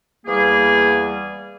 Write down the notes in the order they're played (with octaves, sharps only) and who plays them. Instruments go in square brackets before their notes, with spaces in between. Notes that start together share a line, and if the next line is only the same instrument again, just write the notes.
[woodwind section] E2 G3 A#3 G#4